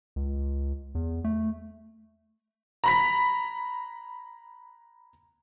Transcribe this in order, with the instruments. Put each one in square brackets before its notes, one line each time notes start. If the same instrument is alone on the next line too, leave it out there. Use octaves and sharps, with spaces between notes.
[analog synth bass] C#2
E2
A3
[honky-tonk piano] A#5 B5 B6